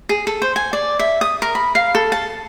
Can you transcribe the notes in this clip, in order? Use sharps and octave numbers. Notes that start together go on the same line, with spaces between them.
G#4
A4
C5
G#5
D5
E5
D#6
A#4
B5
F5
A4
A5